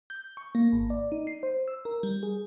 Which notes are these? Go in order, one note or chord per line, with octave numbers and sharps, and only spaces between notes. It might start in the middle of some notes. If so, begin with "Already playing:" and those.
G6
C#6
A#3
G#1
D5
D#4
C7
C5
E6
A#4
G3
G#4